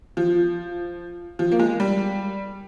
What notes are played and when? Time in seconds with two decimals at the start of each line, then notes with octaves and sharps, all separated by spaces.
0.17 F3
1.39 F3
1.52 A#3
1.60 G#3
1.80 G3